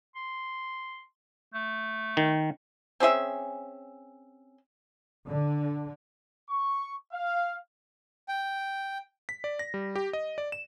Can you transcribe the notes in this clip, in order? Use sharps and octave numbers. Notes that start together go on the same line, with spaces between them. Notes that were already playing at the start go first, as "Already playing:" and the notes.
C6
A3
D#3
C4 C#4 G#4 E5
D3
C#6
F5
G5
B6
D5
A#6
G3
G4
D#5
D5
E7